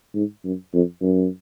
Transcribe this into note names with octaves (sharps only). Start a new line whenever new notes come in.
G#2
F#2
F2
F#2